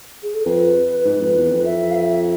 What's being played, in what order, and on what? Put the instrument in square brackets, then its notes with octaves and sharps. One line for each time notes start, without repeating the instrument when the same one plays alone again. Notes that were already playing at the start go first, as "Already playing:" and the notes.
[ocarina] G#4
A4
[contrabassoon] F2 [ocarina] B4
[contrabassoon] G#2
F2
E2
F2
[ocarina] E5
F5
E5